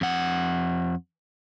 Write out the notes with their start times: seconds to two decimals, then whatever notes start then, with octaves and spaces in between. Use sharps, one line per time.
0.01 F2 F#5